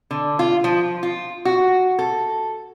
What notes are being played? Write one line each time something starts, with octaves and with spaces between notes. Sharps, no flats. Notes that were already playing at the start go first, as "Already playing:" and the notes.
D3
F4
F3
F4
F#4
A4